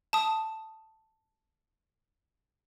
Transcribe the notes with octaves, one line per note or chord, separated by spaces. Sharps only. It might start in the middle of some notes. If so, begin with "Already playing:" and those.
A5 D#6